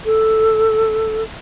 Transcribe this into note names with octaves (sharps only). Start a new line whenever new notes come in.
A4